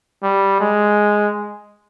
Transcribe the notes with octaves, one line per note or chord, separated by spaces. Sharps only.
G3
G#3